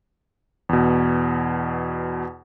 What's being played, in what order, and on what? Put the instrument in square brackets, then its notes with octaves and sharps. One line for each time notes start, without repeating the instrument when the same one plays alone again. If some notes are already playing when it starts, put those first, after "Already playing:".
[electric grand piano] E2 B2